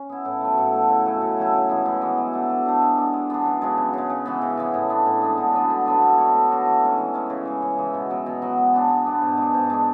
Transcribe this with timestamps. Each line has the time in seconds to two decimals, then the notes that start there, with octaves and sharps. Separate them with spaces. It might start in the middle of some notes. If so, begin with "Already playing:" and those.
Already playing: C#4
0.09 B3 E4
0.25 A2
0.41 F#3 A3
0.58 A2
0.73 F#3 A3
0.89 C#3
1.06 F#3 A3 E4
1.22 C#3
1.37 F#3 A3 E4
1.53 F#2
1.69 E3 G#3 B3
1.86 F#2
2.01 E3 G#3 B3
2.18 F#3
2.33 A3 D4
2.50 F#3
2.66 A3 D4
2.82 G#3
2.98 B3 D4
3.13 G#3
3.30 B3 D4
3.45 F#2
3.62 C#3 G#3
3.77 F#2
3.93 C#3 G#3
4.10 C#3
4.26 E3 G#3 B3
4.42 C#3
4.57 E3 G#3 B3
4.74 A2
4.90 G#3 B3 D4
5.06 A2
5.22 G#3 B3 D4
5.38 D3
5.54 F#3 B3 D4
5.70 D3
5.86 F#3 B3 D4
6.02 A3
6.18 D4 F#4 C#5
6.34 A3
6.49 D4 F#4 C#5
6.65 E3
6.82 G#3 C#4
6.98 E3
7.14 G#3 C#4
7.30 C#3
7.45 E3 G#3
7.62 C#3
7.78 E3 G#3
7.94 B2
8.10 F#3 B3
8.26 B2
8.42 F#3 B3
8.58 G#3
8.74 B3 D4
8.90 G#3
9.06 B3 D4
9.22 G#2
9.37 G#3 D4
9.54 G#2
9.70 G#3 D4